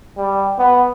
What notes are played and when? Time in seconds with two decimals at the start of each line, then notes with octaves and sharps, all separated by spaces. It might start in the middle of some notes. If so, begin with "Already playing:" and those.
0.17 G3
0.59 B3